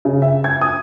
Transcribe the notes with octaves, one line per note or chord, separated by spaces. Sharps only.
C#3
E5
G#6
D#6